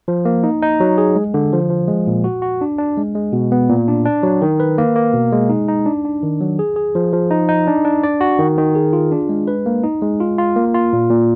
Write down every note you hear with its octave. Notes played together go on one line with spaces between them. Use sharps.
F3
A#3
D#4
D#4
F#3
G#4
G#3
D3
F3
F3
G#3
A#2
F#4
F#4
D4
D4
G#3
G#3
B2
B3
A#2
D4
D4
F#3
D#3
B4
A#3
A#3
B2
G#3
D#4
D#4
D4
D4
D#3
F#3
G#4
G#4
F3
F3
D#4
D#4
D4
D4
D5
F#4
D#3
D#3
G#4
F4
D4
G#3
B4
A#3
D#4
G#3
F4
F4
A#3
F4
A#2
A#2